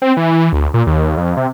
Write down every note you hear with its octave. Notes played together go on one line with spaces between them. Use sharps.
C4
E3
E3
D2
A#2
D#2
F2
C3